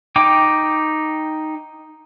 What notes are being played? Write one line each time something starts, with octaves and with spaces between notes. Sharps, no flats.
D#4 G5 D6